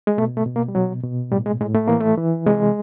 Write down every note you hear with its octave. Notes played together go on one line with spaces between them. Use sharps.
G#3
B2 A3
A3
B2
A#3
G3
B2 F#3
B2
A2 G3
G#3
A2 G#3
A3
E3 A#3
A3
E3
C3 G#3